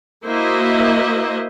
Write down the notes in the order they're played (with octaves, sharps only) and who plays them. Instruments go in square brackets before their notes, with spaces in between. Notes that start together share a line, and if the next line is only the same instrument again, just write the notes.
[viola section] A#3 E4 F#4 C5 D#5 E5